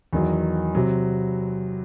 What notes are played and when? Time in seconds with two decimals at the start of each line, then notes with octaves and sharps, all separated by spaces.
0.13 E2 D#3 F#3
0.75 C3 F#3